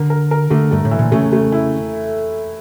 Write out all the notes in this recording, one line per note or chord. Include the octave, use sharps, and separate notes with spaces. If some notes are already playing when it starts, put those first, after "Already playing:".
Already playing: D3 A#4
A#4
A#4
D3 A3
G2 A3
A2
E3
A#2
C#3 A3
A3
E4